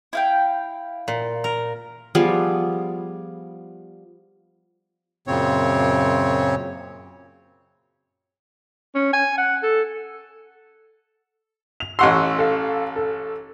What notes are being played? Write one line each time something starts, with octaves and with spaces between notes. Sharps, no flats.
E4 F5 G5
A#2
A#4
F3 G3 B3 G#4
F#2 A#2 C#3 C4 C#5
C#4
G#5
F#5
A4
F7
A1 D#5 F#5 C6 C#6 E6
A4 F5
A4